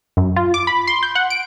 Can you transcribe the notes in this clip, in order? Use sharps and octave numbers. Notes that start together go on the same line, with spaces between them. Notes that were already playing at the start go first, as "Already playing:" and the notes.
F#2
F4
D6
B5
C6
G6
F#5
D7